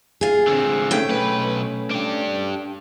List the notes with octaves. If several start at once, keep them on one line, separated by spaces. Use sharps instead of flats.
F4 G#4
D3 C4
A3 C#4 G5
B1 B4
D4 G4